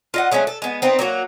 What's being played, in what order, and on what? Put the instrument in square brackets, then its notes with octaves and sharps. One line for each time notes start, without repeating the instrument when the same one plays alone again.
[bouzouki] F4 D#5 F#5
F#3 G#3 A3 C#4
A4
G#3 B3
B3 C4 D#4
F#3 A#3 F#4